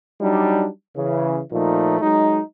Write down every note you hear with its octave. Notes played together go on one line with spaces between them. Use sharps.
F#3 G3 D4 D#4
C#3 E3
A#2 F3 A3 D#4
F#3 G#3 D#4